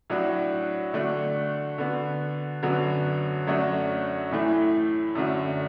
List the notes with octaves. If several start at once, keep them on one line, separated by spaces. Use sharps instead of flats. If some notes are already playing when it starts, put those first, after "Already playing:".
A2 F#3 D4 F#4
D3 A3 D4 F#4
D3 B3 F#4
F#2 D3 F#3 B3 F#4
F#2 F#3 A3 D4 F#4
A2 E3 A3 E4
F#2 D3 A3 D4 F#4